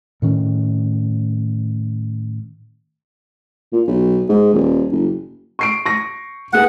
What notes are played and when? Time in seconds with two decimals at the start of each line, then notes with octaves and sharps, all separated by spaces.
0.22 A2 D#3 C#4
3.72 A#2
3.88 B1
4.29 G#2
4.53 D#1
4.92 F#1
5.59 C#6 C7 D7
5.86 C#6 A#6
6.53 A#3 G#4 B4 F#5